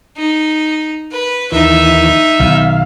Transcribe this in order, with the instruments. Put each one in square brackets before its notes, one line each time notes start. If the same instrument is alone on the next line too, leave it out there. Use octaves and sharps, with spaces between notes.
[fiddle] D#4
B4
[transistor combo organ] D#2 E3 [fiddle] D#4 E5
[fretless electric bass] B1 D#3 [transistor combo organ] F5